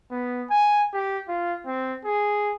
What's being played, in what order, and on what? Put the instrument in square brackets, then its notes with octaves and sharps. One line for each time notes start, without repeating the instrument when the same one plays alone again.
[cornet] B3
G#5
G4
F4
C4
G#4